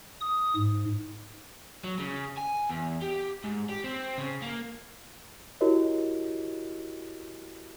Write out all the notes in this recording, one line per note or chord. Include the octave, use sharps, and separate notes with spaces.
D#6
G#2
F#3
C#3
G#5
E2
G4
G#2
G4
C4
C#3
A#3
E4 F#4 G4 A#4 C#5 D#5